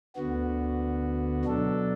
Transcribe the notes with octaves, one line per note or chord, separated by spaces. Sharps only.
D2 D3 B3 F#4
B2 F#3 D4 A4